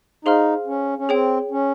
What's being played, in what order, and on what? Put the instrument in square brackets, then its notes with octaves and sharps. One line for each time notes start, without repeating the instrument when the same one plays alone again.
[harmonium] D#4 [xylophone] G#4 C5 F5 C6 F6
[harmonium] C#4
C#4
[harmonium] C4 [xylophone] G#4 C#5 G5
[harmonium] C#4